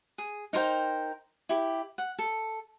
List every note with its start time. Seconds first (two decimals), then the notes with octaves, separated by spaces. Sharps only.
0.18 G#4
0.53 D#4 A#4 C5 G5
1.49 E4 G4
1.98 F#5
2.19 A4